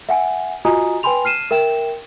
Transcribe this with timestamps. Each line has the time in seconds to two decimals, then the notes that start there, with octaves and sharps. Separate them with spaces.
0.09 E5 F#5 G#5
0.65 F4 F#4 D#5 G#5 A#5 D#6
1.03 B4 G5 G#5 B5 C6 F7
1.24 A5 F6 C7 D#7 E7
1.51 A#4 E5 G5 E7